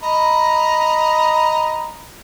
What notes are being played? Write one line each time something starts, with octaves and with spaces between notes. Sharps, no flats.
D#5 A#5 B5